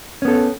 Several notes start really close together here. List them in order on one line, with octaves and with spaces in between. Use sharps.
C#4 B3 A4